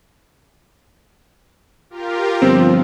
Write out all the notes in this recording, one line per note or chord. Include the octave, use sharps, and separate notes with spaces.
F4 G4 A#4
G1 F3 C4